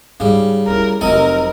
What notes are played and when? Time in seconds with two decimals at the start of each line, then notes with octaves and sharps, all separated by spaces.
0.20 G#2 C#3 G3
0.68 C#4 E4 A#4
1.01 F1 F#3 C4 A#4 D#5